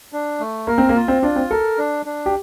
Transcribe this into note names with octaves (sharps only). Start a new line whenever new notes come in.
D4
A3
A#3 A#4
C4
A#3
F4
C4
D4 F4
C4
A4 A#4
D4
D4
G4